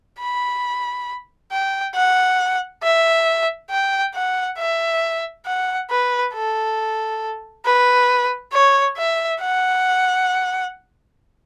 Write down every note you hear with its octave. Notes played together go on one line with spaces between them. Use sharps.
B5
G5
F#5
E5
G5
F#5
E5
F#5
B4
A4
B4
C#5
E5
F#5